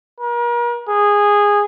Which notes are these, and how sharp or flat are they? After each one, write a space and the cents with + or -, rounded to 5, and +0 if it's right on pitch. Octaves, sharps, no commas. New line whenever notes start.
A#4 +40
G#4 -15